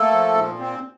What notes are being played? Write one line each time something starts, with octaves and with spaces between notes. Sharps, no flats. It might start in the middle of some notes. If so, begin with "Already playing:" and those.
Already playing: A3 A#3 A4
F3
A#2
C4